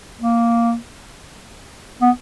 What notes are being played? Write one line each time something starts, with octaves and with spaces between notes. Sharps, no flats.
A#3
B3